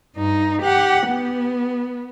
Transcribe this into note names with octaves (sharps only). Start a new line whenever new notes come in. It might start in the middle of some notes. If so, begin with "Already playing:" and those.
G2 D#4
G4 F#5
B3